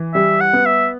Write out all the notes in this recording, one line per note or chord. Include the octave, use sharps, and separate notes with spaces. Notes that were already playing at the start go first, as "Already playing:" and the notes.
Already playing: E3
G3 E5
F#5
B3
E5